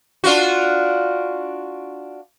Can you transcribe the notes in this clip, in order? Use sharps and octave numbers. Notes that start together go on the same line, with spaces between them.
D4 F4 F#4